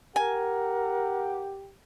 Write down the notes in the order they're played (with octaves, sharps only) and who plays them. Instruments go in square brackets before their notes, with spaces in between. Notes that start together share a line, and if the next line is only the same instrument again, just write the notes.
[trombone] G4 [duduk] A#4 [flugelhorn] F#5 [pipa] G#5